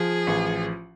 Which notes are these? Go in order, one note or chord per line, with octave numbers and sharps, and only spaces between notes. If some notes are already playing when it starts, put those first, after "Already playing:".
Already playing: F3 G#4
A1